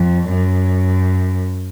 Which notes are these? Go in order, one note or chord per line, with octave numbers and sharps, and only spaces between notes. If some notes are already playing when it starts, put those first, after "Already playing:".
Already playing: F2
F#2